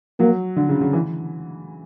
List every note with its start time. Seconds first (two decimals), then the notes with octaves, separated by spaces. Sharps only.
0.19 F#3 A#3
0.56 D3
0.69 C#3
0.81 C#3
0.93 E3